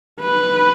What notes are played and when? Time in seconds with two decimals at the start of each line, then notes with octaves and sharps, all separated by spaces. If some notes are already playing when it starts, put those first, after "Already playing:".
0.21 B4